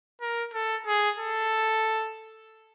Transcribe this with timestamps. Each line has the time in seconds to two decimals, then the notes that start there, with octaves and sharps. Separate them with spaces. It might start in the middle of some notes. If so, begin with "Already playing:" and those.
0.21 A#4
0.53 A4
0.87 G#4
1.18 A4